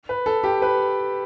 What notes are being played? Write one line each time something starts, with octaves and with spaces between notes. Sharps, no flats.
B4
A4
G4
B4